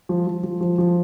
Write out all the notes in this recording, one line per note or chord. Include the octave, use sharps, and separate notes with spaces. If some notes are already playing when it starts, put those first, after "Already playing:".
F3
F3
F3
F3
F3